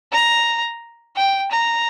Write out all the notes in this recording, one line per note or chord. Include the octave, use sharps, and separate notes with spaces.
A#5
G5
A#5